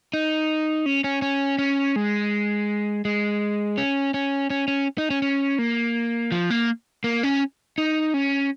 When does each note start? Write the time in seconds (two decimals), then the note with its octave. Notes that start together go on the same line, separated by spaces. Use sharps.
0.14 D#4
0.86 C#4
1.04 C#4
1.22 C#4
1.59 C#4
1.96 G#3
3.05 G#3
3.78 C#4
4.14 C#4
4.50 C#4
4.68 C#4
4.98 D#4
5.10 C#4
5.22 C#4
5.59 A#3
6.32 F3
6.50 A#3
7.04 A#3
7.23 C#4
7.78 D#4
8.14 C#4